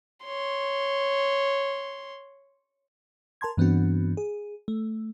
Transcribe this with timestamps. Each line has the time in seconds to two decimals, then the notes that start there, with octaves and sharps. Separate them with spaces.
0.24 C#5 C6
3.41 A#4 A5 C6 G#6
3.57 G2 E3 B3 C4 D4 F#4
4.17 G#4
4.68 A3